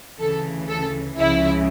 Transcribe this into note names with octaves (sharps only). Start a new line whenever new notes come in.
D2 C#3 E3 A4
A4
C#2 C#3 F3 E4